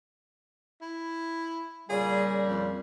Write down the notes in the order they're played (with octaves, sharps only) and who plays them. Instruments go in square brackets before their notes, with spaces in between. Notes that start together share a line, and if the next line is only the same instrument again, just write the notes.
[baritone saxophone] E4
[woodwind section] A#2 C#3 G3 [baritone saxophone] G#4
[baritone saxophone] F2